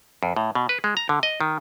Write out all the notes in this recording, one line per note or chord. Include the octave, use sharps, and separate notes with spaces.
F2
A2
B2
B4
G#3
A#5
D3
D#5
D#3